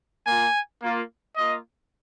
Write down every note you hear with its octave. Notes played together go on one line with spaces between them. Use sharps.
A#3 F4 G#5
A#3 F4
A#3 F4 D#5